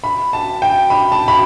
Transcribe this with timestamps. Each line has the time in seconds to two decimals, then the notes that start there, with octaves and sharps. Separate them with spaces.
0.04 B5
0.33 A5
0.62 G5
0.90 B5
1.12 A5
1.28 B5